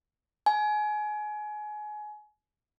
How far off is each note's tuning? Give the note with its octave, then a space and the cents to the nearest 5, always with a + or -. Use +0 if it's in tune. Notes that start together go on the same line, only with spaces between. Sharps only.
G#5 +25